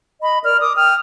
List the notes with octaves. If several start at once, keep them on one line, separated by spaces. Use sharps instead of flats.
D#5 B5
A#4 D5 F6
D6 D#6
G5 D#6 F6